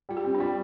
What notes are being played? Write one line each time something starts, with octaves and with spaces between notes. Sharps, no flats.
G3 F4
G4
C4
D4
G3 F4